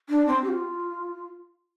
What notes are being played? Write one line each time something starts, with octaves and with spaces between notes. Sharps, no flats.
D4
C4
G4
F4